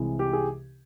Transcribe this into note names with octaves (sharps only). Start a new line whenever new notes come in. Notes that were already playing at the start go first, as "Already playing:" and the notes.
Already playing: C2 C3 E3 G#3
G4
G#4